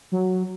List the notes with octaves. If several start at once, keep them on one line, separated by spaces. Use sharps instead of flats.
F#3